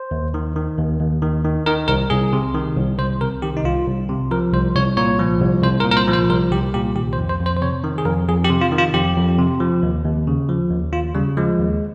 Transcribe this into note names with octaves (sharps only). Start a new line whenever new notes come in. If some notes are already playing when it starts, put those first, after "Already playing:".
Already playing: C5
D#2
D#3
D#3
D#2
D#2
D#3
D#3
D#3 A#4
C2 A#4
C2 G#4
C3
D#3
C2
C2 C5
C3 A#4
D#3 G4
D#4
C2 F4
C2
C3
F3 A#4
C2 C5
C2 C#5
A#2 C#5
F3
C2
C2 C5
A#4
A#2
A#4
C5
F3
C5
C2 A#4
C2 G4
A#2 G4
D#3 G4
C5
F2
C5
F2
C5
C5
C3 C#5
D#3
G#4
F2 A#4
F2 G#4
G4
C3
F4
D#3
F4
F2 G4
F2
C3
F3
D#2
D#2
C#3
F3
D#2
D#2 F4
C#3 G3
F3 G#3
D#2